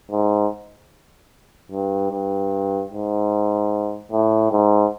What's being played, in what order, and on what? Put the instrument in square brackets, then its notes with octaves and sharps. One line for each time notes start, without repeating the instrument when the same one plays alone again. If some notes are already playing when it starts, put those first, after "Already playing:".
[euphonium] G#2
G2
G2
G#2
A2
G#2